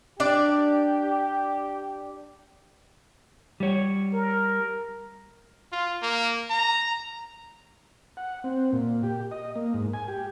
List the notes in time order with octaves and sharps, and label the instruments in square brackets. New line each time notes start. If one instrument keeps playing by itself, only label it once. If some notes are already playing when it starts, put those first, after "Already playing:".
[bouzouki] D4 D5 [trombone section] G4
[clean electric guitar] G3 C#5
[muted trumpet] A#4
[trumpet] F4
A#3
A#5
[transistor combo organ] F#5
C4
A#2
G4
D#5
A#3
G#2
G#5
G4